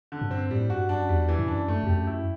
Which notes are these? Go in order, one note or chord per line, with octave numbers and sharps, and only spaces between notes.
D3
G2
C4
A2 G3
G2 F#4
F#2 D4
E2 G3
E3
F#2
D4
G2 A3
F#2
E2
G4
F#2
E4